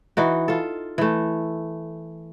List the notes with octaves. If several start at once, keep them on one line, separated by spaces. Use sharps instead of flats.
E3 D#4 F#4
F4 A4
E3 A3